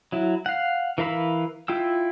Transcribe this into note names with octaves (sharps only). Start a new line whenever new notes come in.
F#3 E4
F5 F#5
E3 A#4 F5 B5 E6
E4 F4 G5 E6